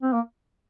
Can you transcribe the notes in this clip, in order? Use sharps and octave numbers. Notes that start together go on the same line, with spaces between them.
C4
A#3